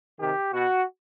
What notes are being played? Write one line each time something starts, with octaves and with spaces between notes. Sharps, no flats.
C3 D#3 G4
B2 F#4